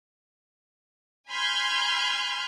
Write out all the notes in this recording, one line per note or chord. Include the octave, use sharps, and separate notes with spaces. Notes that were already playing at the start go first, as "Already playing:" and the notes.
G#5 B5 C6 F6 G6 G#6